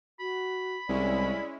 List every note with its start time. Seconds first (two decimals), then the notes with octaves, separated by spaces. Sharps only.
0.20 F#4 B5
0.89 C2 G#3 C#4 E4 D5